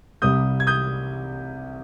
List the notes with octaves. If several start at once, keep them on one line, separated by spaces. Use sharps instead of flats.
C2 C3 G3 D#6 G6
G#6
D#6 G6